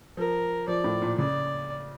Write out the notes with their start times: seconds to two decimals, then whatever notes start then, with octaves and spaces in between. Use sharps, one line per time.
0.17 F3 A#4
0.68 F3 D5
0.84 A2
1.02 A#2
1.18 C#3 D5